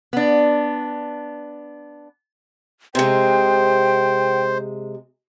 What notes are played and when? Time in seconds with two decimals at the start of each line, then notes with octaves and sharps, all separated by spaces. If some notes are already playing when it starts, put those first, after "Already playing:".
0.13 B3 D4
2.95 C3 G#3 C5 G5